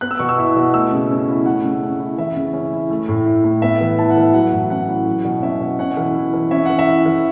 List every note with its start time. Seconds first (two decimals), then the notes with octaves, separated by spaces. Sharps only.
0.01 B3 F#6
0.11 E6
0.19 B2 C#6
0.29 E6
0.38 E4
0.56 B2
0.74 A3 E6
0.92 C#3
1.11 C#4
1.29 E4
1.46 A3 F#5
1.64 C#3
1.83 C#4
2.00 E4
2.18 E3 E5
2.36 C#3
2.54 C#4
2.73 E4
2.90 A3
3.09 A2
3.26 E4
3.44 A2
3.62 B3 E5
3.81 E3
3.99 E4 A5
4.10 F#5
4.17 E3 E5
4.33 F#3 F#5
4.53 A2
4.70 C#4 F#5
4.88 E4
5.07 F#3
5.25 B2
5.42 C#4 E5
5.61 B2
5.79 C#4 F#5
5.97 E3
6.15 E4
6.34 E3
6.51 C#4 E5
6.65 E3 F#5
6.79 E5
6.87 E4
7.06 E3